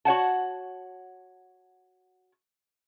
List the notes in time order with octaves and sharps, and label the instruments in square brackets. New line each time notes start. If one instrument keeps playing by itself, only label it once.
[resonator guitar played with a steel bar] F#4 C#5 F#5 A5